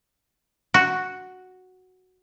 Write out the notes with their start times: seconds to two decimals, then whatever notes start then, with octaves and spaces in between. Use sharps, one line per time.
0.74 F#4